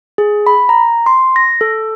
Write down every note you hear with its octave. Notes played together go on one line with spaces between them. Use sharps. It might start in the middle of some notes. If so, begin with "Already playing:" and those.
G#4
B5
A#5
C6
A#6
A4